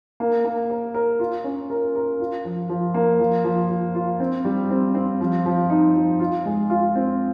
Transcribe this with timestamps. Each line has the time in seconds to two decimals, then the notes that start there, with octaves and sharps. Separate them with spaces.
0.20 A#3
0.45 A#3
0.70 A#4
0.94 A#4
1.19 F4
1.44 C#4
1.70 A#4
1.95 A#4
2.20 F4
2.45 F3
2.69 F3
2.94 A#3
3.19 F3
3.44 F3
3.69 F3
3.95 F4
4.20 C4
4.45 G3
4.70 C4
4.95 C4
5.21 F3
5.46 F3
5.70 D#4
5.96 F3
6.20 F4
6.46 G#3
6.70 F4
6.95 C4